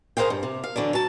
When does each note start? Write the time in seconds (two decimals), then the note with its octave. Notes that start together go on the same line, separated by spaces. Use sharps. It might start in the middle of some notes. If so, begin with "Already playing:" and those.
0.17 G#4 A#4 C5 F5 G5
0.30 G2
0.43 C3
0.64 F5
0.76 D3 E3 F#3 D4
0.93 F#3 A5